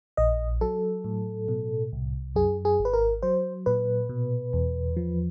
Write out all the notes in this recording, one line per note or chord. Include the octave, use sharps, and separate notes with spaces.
A#1 D#5
F#3 A4
A2
B2
C2
F#2 G#4
G#4
G#1
B4
A#4
F#3 C5
A#2 B4
B2
E2
F3